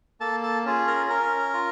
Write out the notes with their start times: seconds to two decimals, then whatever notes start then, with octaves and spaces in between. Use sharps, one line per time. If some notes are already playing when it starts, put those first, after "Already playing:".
0.20 A#3 A4 A5
0.43 A4 A5
0.65 C#4 F4 G#4
0.87 A#4 A#5
1.09 C#4 A#4 A#5
1.54 F4